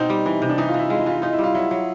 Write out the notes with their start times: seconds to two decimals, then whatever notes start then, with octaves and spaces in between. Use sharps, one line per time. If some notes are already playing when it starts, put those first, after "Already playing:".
Already playing: B2 C4 D#4
0.10 G3
0.26 E3
0.42 C3
0.49 D4
0.58 E3 D#4
0.68 F4
0.74 E3
0.79 E4
0.90 G#3 F4
0.98 E4
1.06 E3 F4
1.22 D#4 F4
1.33 E4
1.39 G3 F4
1.55 F#3 E4
1.71 F#3